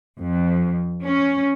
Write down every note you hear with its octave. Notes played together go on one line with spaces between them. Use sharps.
F2
C#4